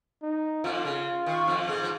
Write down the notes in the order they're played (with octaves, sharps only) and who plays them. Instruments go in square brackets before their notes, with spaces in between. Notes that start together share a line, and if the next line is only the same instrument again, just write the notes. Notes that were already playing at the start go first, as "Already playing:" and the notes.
[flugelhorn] D#4
[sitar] F2 F3 [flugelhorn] F4
[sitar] C#3
D#3
F2 F3
G#2 G#3
F3